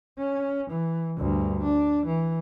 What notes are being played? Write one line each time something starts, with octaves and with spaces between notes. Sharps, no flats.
C#4
E3
D2 G2
D4
E3